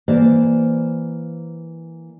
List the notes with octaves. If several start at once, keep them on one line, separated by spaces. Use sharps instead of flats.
E3 A#3 C5 D5